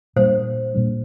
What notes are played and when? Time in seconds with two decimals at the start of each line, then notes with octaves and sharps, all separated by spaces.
0.16 A#2 G3 D4 C5
0.74 A#2 G3 D4